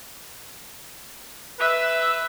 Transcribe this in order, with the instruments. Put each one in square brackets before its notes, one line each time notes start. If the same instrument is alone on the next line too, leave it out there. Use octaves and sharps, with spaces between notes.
[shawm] B4 [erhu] E5